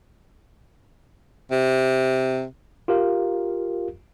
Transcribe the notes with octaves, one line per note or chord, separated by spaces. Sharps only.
C3
F4 G4 A#4 F5